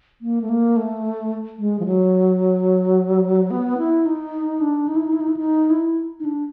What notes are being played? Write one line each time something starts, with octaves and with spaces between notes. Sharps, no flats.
A#3
A3
A#3
A3
G#3
F3
F#3
B3
E4
D#4
D4
D#4
E4
D#4
E4
D#4
E4
D#4
E4
D#4
D4